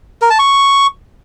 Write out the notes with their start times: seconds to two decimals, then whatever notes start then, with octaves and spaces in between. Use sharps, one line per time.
0.21 A#4
0.30 A5
0.39 C#6